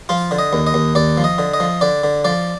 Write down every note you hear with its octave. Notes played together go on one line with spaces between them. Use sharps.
F3 F4
D3
D#5
D#2
D#5
D#2
D#2 D5
F3
D#5
D3
D#5
F3
D3 D5
D3
F3 D5